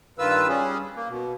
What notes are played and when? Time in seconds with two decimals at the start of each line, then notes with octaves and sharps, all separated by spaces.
0.19 G2 D#3 F4 B4 E6
0.48 G3 C#4 G#4
0.96 A#3
1.09 B2